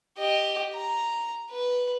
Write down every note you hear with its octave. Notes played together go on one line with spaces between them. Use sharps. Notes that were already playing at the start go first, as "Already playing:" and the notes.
G4 D#5
A#5
B4